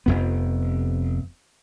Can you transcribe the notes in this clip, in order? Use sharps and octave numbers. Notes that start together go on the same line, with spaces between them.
F1 F2 B3